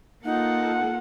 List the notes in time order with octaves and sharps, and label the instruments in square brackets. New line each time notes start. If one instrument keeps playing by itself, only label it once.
[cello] A#3 [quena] D#4 [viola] F4 A4 [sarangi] F#5